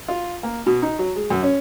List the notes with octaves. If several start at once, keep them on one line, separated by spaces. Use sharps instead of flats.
F4
A#3
B2
D#4
F#3
G#3
F#2
C#4